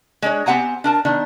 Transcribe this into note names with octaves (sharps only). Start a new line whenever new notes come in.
G#3 D4 C#5
B3 C4 G4 F#5 G#5 A#5
D4 A#4 A5
D#3 B3 D4